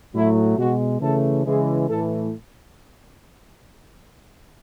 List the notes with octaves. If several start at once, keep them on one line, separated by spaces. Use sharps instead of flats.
A2 F#3 A3 E4
B2 G#3 F#4
C#3 E3 A3 A4
C#3 E3 G#3 G#4
A2 E3 A3 A4